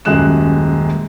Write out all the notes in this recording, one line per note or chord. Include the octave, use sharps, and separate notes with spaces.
D#1 F#2 G#3 F#6 E7